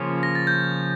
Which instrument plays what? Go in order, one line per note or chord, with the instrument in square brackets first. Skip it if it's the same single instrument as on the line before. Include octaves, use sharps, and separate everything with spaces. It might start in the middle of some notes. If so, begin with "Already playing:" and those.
Already playing: [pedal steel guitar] C#3 F3 A#3 C#4 F4
[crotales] A#6
A6
G6